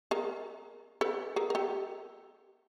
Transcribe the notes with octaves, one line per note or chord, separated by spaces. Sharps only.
G#4 A#4
A4 B4
G#4 A#4
A#4
G4 A4